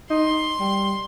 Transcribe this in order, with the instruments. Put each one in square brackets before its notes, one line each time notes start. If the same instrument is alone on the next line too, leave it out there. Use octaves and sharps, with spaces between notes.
[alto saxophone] D#4 [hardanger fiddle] C6
[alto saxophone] G3